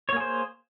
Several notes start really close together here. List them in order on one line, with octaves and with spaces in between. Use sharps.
C#5 A#3 G#4 C5